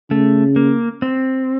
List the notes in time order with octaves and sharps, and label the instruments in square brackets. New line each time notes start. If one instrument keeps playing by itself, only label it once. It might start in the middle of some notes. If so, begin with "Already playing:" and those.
[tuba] C#3 [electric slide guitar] A3
[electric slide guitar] A#3
C4